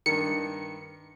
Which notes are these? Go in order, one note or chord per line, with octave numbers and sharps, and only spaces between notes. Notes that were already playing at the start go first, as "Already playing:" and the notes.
G2 D#3 C#7